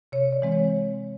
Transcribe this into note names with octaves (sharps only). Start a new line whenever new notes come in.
C3 C#5
D5
E3 G#3 C4
C#5